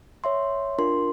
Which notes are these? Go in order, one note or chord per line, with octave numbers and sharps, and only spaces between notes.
C#5 E5 C6
D4 F4 A#4 C6